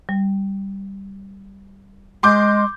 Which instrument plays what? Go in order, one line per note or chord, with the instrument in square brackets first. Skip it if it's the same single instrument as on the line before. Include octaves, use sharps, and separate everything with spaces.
[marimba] G3
[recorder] G#3 [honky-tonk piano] C6 D6 G6